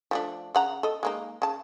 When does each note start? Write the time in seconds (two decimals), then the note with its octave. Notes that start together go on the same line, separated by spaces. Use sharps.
0.11 F3 A3 D4
0.55 C#3 F#5 A#5
0.83 A4 D#5
1.03 G#3 A#3 D#4
1.42 C#3 A5